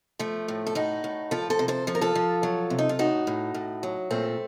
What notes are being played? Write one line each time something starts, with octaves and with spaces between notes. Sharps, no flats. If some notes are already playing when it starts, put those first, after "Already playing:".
F3 A3
A2
A4
A2 D#4 F#4
A2
F3 F4 A4
A4 C5
C3
A4 C5
F3 A4
A#4
F4 A4
F3
F#3
C3
D#4
F4
A2 D#4 F#4
A2
A2
F#3
A#2 A3 C4